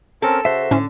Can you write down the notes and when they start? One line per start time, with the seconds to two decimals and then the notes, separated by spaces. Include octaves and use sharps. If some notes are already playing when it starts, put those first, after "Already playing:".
0.22 C4 C#4 A4 A#4
0.45 C#3 F#4 C5 E5
0.71 A2 D3 C#4